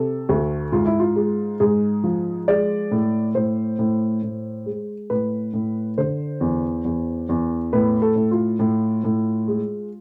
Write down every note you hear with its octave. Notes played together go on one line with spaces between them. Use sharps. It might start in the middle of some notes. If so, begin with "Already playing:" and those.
Already playing: C3 A4
D2
G#2 F4
E4
F4
G#3
G#2 G#4
F3
G#3 D5
A2
A2 C5
A2
A2
G#3
A2 B4
A2
D3 C5
E2
E2
E2
A2 B4
A4
A2
F4
A2
A2
G#3